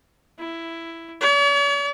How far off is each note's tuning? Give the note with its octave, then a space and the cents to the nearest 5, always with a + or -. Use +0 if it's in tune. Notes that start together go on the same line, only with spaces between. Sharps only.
E4 +10
C#5 +45